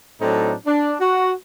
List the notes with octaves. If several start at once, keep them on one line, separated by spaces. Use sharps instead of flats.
A2 F#3 C4 D4 D#4
D4
F#4